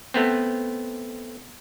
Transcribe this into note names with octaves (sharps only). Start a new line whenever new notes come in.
A3 B3 C4